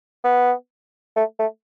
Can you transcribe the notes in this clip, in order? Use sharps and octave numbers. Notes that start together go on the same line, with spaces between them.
B3
A3
A3